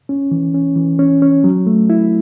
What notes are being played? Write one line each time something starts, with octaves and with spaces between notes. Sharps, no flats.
C#4
E3
C#4
E3
C#4
C#4
F#3
A3
E4